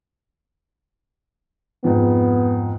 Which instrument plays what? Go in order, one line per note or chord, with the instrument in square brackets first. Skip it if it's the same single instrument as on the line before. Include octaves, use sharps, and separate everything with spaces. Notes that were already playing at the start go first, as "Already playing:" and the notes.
[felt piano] F2 G#2 [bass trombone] B3